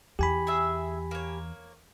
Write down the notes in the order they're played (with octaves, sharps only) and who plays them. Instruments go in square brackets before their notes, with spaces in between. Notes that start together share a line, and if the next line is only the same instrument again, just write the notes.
[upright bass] E2 [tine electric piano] G4 G#5 B5
[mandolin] G#4 E5
A#3 C#5